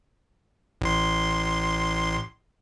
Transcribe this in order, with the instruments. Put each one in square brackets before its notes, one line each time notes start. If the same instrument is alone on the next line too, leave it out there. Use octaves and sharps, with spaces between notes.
[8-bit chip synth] A1 C6